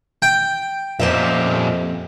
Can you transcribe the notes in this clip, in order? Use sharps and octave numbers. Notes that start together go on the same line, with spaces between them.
G5
F2 A#2 G4 C5 D#5 E5